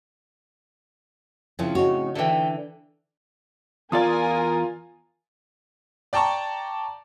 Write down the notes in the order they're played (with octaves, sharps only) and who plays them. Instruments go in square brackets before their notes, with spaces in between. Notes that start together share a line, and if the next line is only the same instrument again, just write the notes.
[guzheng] C#3 [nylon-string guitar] F3 C4 E4
[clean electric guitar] F2 A2 C#5 [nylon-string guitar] D#4 F#4
[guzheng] D3 E3 [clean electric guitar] A4 E5 G5
[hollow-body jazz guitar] E2 D5 [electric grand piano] F4 D#6 [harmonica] A#4 [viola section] G#5
[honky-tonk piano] D5 G5 A5 A#5 C#6